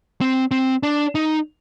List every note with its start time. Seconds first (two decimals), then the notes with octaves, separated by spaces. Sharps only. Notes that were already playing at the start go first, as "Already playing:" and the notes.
0.21 C4
0.51 C4
0.83 D4
1.15 D#4